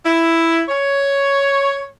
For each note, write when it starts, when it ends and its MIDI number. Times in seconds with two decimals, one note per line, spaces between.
0.04 0.62 64
0.68 1.85 73